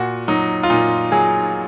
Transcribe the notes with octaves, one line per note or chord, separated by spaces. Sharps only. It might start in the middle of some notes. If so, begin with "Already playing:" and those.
Already playing: A#2 F#4
F#3 D#4
F4
A#2 D#4
F#3 G#4